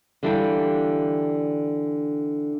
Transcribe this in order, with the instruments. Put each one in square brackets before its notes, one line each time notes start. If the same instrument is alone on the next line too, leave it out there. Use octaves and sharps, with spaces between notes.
[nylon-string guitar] D3 E3 G3 D4 F5 G5